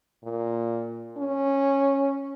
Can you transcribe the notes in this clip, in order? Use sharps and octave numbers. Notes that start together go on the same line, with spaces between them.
A#2
C#4